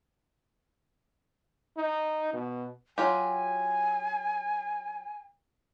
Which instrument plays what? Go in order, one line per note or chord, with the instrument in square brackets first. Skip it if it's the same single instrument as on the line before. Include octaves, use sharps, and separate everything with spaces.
[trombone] D#4
B2
[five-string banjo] F#3 F4 G4 [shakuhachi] G#5